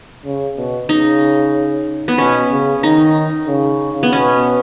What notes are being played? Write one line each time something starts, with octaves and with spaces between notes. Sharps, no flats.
C#3
B2
C#3 D#4
B3
B2 C#4
C#3
D#3 D#4
C#3
B3
B2 C#4